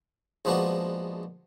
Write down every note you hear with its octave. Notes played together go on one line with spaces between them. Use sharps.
A#1 F3 G#3 B3 D4 F#4